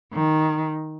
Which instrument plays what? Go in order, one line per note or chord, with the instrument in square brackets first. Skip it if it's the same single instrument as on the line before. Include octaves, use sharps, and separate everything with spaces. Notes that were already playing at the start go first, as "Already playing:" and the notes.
[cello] D#3